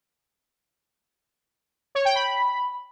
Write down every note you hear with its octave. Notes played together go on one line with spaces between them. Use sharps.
C#5
G5
B5